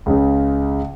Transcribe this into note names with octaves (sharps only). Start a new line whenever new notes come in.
C#2 C#3